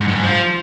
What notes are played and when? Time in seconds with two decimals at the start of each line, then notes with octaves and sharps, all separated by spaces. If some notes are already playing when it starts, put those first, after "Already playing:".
0.01 G#2
0.08 G2
0.15 G#2
0.23 F3